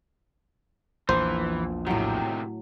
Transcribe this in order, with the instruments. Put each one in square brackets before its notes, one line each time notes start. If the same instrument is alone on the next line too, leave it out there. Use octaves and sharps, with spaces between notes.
[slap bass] A#1 E2 [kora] A#2 [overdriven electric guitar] E3 [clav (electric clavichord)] C5
[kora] A2 F#3 [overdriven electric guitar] C3 D#3